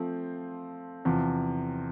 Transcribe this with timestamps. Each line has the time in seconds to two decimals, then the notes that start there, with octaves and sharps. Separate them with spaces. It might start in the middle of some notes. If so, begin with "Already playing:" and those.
Already playing: F3 A3 C4
1.05 E2 C3 F3